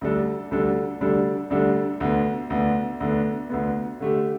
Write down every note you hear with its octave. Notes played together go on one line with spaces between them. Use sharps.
D2 D3 G3 D4 A4
D2 D3 G3 D4 A4
D2 D3 G3 D4 A4
D2 D3 G3 D4 A4
D2 D3 B3
D2 D3 B3
D2 D3 B3
D2 D3 B3
D3 A3 G4